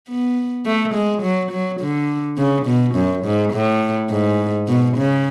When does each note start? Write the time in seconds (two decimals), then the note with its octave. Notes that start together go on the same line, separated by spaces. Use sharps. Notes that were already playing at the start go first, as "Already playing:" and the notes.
0.09 B3
0.66 A3
0.94 G#3
1.23 F#3
1.51 F#3
1.80 D3
2.38 C#3
2.66 B2
2.95 F#2
3.25 G#2
3.53 A2
4.10 G#2
4.68 B2
4.97 C#3